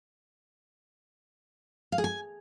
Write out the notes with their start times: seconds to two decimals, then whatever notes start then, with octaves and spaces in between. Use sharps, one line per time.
1.92 F5
1.98 G#4
2.04 G#5